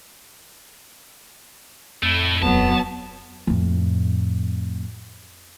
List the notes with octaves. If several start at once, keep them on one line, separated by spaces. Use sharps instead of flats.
F2 A3 E4
D#1 E3 F#3 B3 A5
F2 A2